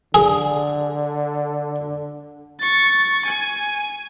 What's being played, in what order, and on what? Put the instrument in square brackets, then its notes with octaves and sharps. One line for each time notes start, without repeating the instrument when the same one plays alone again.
[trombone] D3 [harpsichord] G#4
[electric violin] C#6 A6
G#5